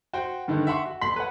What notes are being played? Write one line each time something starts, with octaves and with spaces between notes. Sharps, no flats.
F#4 C5 G5
G2 D3 D#3
E5 F#5 C6 C#6
F#4
E1 C6 B6 F#7
B4 C#5 F#5